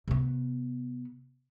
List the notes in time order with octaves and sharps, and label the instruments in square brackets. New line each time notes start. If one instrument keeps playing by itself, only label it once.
[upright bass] C3 B3